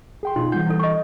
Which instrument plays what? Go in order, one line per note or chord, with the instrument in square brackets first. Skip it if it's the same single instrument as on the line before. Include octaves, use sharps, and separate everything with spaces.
[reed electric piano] G#4 G5 C6
[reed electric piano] B2 D#4 F4 [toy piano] C6
[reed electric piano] E3 G3 G6 [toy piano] F#5
[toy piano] E4 A4
D#5 C#6